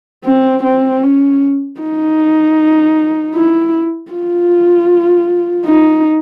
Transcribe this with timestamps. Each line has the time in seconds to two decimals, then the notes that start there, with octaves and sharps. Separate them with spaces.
0.25 C4
0.63 C4
1.03 C#4
1.80 D#4
3.35 E4
4.11 F4
5.66 D#4